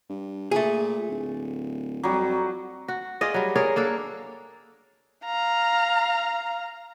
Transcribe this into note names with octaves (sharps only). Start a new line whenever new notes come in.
G2
A#2 A3 G#4
D1
F2 F#3 G3
F#4
F4 G#4 D5 D#5
F#3 G3
G#4 A#4 C#5 D5
A#3 D4 A4
F5 A#5